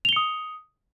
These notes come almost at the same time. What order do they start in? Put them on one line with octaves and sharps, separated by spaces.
F7 G7 C#7 D#6